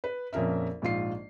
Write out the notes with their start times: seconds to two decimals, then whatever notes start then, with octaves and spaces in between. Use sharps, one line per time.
0.04 B4
0.33 A#1 F2 C#4 A#4 E5
0.82 A#1 G#2 F4 C7